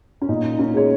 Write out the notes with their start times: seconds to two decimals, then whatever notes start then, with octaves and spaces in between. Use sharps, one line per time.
0.22 C#4
0.29 A#2 D#4
0.59 C#4
0.74 G#3 C#5